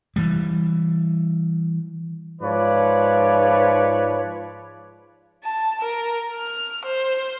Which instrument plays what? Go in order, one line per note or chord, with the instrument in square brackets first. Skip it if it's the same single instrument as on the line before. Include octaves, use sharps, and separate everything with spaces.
[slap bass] E3 G3
[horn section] G#2 F3 B4 C#5 D5
[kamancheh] A5
A#4
F6
C5